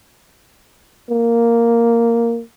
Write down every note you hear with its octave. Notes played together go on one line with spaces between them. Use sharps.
A#3